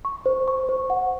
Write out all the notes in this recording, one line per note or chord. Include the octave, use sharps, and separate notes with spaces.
C#6
C5
C#6
C5
F#5